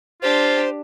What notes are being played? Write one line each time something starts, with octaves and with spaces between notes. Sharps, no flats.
D4 F4 G4 C5